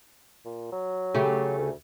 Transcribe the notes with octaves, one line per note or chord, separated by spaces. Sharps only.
A#2
F#3
C#3 A3 G4
D2